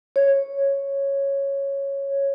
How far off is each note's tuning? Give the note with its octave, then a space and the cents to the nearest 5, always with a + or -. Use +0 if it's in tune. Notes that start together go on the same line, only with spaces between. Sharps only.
C#5 -5